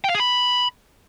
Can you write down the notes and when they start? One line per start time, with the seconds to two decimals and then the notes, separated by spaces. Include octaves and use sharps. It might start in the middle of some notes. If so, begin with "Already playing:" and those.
0.04 G5
0.10 F5
0.15 G#4
0.20 B5